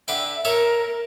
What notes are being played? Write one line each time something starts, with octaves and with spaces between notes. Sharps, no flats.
D3 B4 E5 G5
A4 A#4 C#5 E5